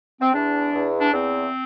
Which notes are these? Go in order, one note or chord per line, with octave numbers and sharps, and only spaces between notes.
C4
E2 D4
E2
D4
E2 C4